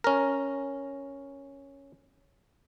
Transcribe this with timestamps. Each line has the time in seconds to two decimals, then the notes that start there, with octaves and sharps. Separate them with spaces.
0.04 C#4 A#4